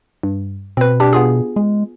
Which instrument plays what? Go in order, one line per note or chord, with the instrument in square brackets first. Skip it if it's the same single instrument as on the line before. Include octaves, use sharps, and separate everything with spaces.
[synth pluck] G2
[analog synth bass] B2 [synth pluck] C4 B4
[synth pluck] D4 G4
B3 F4 G#4
[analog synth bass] G#3